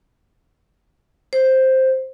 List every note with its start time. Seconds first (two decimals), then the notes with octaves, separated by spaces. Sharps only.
1.33 C5